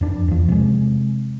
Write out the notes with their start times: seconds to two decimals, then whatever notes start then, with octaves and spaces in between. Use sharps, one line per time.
0.01 F2 D4
0.28 E2 F3
0.48 C3 G#3